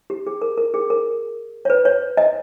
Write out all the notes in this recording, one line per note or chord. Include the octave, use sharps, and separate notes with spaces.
G4
G#4
A#4
A#4
G#4
A#4
C#5
B4
C#5
D#5